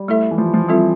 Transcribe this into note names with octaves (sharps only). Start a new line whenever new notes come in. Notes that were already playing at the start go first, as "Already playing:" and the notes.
Already playing: G3
A3 E4 A4 E5
E3
F3
F3
G3 C4 F4 A4 E5